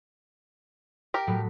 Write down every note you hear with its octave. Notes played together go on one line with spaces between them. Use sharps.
G4 A#4
A2 F#3 B5